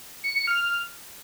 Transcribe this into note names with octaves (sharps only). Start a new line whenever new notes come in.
C#7
C#7
F6